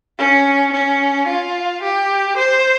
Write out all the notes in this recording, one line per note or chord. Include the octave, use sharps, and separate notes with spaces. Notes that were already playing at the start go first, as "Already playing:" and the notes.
C#4
C#4
F4
G4
C5